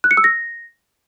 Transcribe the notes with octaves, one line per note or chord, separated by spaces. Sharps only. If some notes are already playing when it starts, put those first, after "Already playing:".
F#6
C#7
E6
A#6